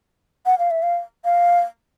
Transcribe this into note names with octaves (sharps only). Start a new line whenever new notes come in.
F#5
F5
E5
F5
F5